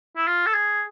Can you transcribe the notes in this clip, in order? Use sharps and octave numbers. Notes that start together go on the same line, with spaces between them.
E4
F4
A4
G#4